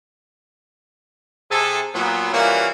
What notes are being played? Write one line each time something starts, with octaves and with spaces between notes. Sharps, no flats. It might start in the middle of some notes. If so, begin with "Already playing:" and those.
C3 G#4 A4
A#2 F#3 B3
A#2 E3 G3 A#3 C#4 F#4